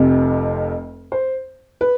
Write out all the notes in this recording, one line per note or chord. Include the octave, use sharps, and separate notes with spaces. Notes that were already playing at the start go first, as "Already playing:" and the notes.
Already playing: F1 F2 C3
C5
B4